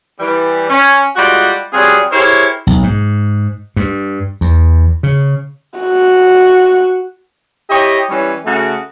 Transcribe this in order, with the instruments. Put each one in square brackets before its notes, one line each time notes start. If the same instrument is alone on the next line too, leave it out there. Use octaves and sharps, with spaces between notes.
[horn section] E3 G3
C#4
G3 G#3 F4 F#4
F#3 G3 C4 F4 G#4
E4 G4 G#4 A#4 C5 C#5
[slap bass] B1
G#2
G2
E2
C#3
[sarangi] F#4
[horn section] E4 G4 C#5 D#5
E3 G3 C#4
C#3 A3 F#4